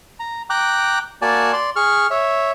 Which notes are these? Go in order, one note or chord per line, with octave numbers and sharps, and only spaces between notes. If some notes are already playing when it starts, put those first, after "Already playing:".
A#5
G5 A#5 D6 F#6
A#3 F#4 D5 G#5 A5
D5 C6
G#4 C#6 F6
C#5 E5